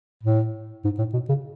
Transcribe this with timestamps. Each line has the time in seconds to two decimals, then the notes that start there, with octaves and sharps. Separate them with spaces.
0.23 A2
0.84 G#2
0.98 A2
1.13 B2
1.29 C#3